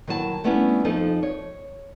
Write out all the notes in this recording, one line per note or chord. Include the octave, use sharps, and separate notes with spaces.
D#3 F#3 E4 A5
G3 A3 B3 C#4 D4 E4
F2 F3 D#4 A4
C#5